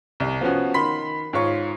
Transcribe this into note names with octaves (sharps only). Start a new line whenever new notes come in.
C2
F3 B3 C#4 F#4
D#3 B5 C6 B6
G#2 F4 C#5 C#6